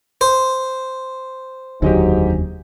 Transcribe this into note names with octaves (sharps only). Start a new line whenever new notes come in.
C5
F1 D#2 G#2 D3 F#3 D#4 G4